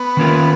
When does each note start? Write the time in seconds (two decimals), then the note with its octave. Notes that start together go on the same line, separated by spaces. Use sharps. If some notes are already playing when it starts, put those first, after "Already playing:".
Already playing: B3
0.17 D#3 A#3 C#4 F4 A#4